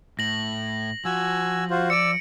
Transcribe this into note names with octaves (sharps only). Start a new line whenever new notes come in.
A2 A#6 F#7
F3 F#4 G#5 E6
F4 F#4 C5
D5 E6 C#7 D7